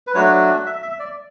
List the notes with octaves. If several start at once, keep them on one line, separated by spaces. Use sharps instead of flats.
B4
F#3 A3 D4 F#4 C#5
E5
E5
D5